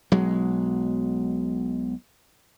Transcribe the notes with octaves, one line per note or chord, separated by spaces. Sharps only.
B1 F#3 G#3